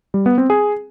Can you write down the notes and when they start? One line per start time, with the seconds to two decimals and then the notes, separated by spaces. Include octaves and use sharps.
0.14 G3
0.26 B3
0.38 C4
0.50 G#4